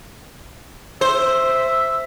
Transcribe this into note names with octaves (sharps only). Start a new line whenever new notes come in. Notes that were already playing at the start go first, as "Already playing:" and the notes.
C5 E5